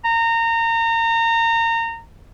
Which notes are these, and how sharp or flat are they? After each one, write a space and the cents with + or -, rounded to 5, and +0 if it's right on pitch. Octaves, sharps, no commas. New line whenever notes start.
A#5 -25